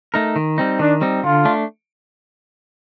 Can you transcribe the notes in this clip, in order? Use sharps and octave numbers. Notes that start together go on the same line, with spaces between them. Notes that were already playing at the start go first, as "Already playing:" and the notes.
A3 D#4 A#4
D#3
G3 C4 D#4
D#3 D4
G3 C4 D#4
D3 F4
A3 D4